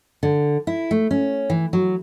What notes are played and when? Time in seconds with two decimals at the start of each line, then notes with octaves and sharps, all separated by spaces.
0.23 D3
0.67 E4
0.91 A3
1.11 C#4
1.50 E3
1.73 F#3